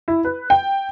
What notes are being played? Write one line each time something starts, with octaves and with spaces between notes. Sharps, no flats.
E4
B4
G5